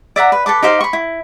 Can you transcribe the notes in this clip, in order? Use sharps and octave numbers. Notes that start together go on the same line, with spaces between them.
D5 E5 F#5 A#5
B4
A4 B4 A5 D6
D#4 G4 C5 F5
B5 C#6
E4